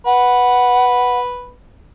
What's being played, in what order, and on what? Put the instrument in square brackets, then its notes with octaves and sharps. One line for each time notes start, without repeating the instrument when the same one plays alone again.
[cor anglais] B4 [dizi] F#5